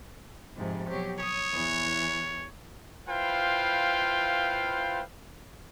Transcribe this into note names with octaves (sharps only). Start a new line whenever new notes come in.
F2 G#2 C3
B2 F#3 G4
C#5 D#6
E2 E3
E4 F4 B4 C5 F5 G5